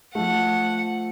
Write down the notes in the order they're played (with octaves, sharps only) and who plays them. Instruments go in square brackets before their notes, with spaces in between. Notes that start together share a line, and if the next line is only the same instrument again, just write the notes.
[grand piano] F3 A3 [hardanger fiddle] F#5